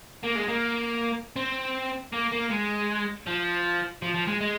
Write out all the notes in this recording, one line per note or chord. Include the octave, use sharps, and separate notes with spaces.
A#3
G#3
A#3
C4
A#3
A#3
G#3
F3
F3
F3
G#3
G#3